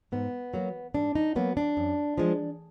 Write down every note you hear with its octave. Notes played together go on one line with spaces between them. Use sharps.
G#2 B3
F#3 A#3
G#2 D4
D#4
F#3 A#3 B3
D4
F#2
F3 G#3